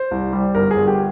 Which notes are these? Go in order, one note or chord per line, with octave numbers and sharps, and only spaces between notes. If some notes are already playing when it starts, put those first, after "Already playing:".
Already playing: C5
C2
G3
G1 A#4
G#4
G1
G4